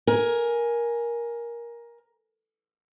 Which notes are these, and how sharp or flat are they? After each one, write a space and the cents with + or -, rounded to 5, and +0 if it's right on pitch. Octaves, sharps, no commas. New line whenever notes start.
A#4 +15 G#5 +0